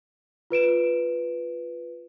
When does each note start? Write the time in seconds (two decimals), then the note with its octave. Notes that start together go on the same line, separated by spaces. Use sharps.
0.50 F4 B4 D7 E7